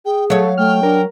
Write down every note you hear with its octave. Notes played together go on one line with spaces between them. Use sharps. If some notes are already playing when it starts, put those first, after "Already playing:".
G#4 G5
F#3 A3 C#5 F5
A3 G5 F6
D4 A#4